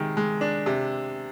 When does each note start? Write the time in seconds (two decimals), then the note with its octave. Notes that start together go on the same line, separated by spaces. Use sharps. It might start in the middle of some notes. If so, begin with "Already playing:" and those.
Already playing: C3 D#3 G#3
0.17 G#3
0.41 D4
0.66 C3